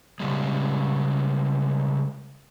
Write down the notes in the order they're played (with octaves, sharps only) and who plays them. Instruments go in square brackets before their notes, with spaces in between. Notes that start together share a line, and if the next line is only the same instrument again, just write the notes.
[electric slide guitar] C#3 G3 G#3